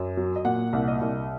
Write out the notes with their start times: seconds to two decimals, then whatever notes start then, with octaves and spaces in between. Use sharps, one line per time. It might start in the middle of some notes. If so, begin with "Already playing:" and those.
Already playing: F#2
0.17 F#3
0.36 D#5
0.45 A#2 F#5
0.73 C2
0.88 D#5
1.01 C2